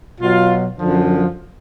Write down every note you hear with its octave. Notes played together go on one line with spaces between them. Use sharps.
B2 F#3 F4
F#2 D3 F3